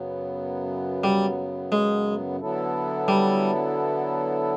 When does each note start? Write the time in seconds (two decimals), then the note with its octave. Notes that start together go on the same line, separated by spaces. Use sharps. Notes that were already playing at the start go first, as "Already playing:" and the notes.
Already playing: F#2 C#3 F#3 B3
1.04 G3
1.72 G#3
2.40 D3 F#3 B3 E4 A4
3.08 G3